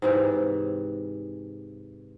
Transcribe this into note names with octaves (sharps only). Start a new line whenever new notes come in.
G#2 C3 E3